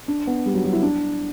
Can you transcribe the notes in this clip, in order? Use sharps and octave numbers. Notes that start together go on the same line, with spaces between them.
D4
B3
G3
F#3
F#3
E4
D4